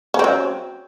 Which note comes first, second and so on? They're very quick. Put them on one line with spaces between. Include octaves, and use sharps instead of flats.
C#4 C4 F#3